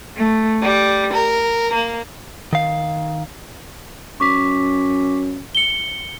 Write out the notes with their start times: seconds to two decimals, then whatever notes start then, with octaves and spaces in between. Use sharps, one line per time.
0.17 A3
0.63 G3
1.12 A#4
1.73 A#3
2.53 D#3 F5
4.20 F#2 C#6 D6 B6
5.55 C#7 G7